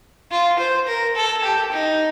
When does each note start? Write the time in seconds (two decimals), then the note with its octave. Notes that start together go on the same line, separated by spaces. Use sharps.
0.31 F4
0.59 C5
0.87 A#4
1.16 A4
1.44 G4
1.72 D#4